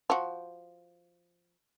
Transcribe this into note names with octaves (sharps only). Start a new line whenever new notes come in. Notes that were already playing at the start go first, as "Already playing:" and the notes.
F3 F#4